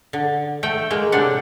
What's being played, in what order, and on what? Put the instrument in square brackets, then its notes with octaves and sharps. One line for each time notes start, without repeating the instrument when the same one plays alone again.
[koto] D3
A3 G5
G#3 A#3
A2 C3 D4 F#5